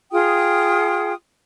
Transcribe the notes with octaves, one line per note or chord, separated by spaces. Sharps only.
F4 G#4 G5 D#6